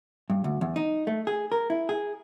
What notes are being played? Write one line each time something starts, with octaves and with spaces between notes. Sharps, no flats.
G2
D2
E2
D#4
A3
G#4
A#4
E4
G#4